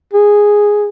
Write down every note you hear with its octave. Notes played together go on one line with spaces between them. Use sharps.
G#4